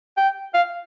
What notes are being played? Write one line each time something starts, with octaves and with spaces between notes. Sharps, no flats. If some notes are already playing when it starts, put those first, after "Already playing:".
G5
F5